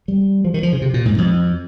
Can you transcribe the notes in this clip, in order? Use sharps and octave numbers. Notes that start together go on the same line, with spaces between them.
G3
F3
D#3
F3
C#3
C3
A#2
G#2
F2